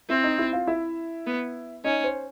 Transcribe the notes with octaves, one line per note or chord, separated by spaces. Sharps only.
C4 E4 E5
D#4 D#5
E4 E5
F4 F5
E4 E5
B3
C#4 D#4 D#5
C5